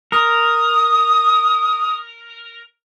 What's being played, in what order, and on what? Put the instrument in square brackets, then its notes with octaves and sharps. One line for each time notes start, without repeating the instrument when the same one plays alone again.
[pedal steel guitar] A#4 [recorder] D#6